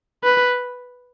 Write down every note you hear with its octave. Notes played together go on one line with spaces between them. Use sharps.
B4